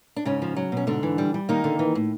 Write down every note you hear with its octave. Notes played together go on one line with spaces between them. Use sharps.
D4
G#2 C#3 C#4
F3
F#3
B2 C#4
G#2 D3 D4
E3
G3
G3
D#3 A#3 D#4
D3
E3
A2